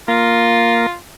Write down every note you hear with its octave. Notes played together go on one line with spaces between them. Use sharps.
A#3 F4 A#4